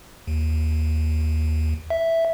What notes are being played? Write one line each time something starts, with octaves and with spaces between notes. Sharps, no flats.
D#2
E5